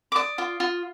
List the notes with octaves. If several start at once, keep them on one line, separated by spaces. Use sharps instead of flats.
D6
D5 D#6
F4
F4